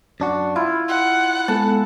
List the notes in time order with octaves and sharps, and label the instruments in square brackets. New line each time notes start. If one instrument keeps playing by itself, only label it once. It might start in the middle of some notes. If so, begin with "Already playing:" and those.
[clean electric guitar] F#2 D4 F#4
[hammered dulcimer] E4 [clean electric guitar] F4
[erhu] F#5
[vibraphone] G#3 B3 A4 [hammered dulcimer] A5